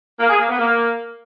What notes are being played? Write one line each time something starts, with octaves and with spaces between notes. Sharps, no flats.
A#3
G#4
A#3
B3
A#3